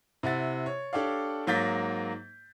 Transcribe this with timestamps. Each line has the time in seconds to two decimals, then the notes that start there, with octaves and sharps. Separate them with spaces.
0.23 C3 E4 F#5 A6
0.66 C#5
0.93 D4 G4 A4 C#5 D5 F5
1.47 G#2 F#3 A#3 G6 A6 B6